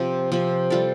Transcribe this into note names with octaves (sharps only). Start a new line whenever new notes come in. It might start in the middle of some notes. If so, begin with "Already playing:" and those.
Already playing: C3 F3 C4
C3 F3 C4
G3 F4 A4